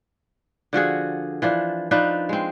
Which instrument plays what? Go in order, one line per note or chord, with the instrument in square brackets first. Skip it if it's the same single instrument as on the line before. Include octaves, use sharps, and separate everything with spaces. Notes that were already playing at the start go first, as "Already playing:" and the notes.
[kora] D3 F3 F#4 G#4
E3 F3 D4
F3 D4 D#4 B4
G#3 C4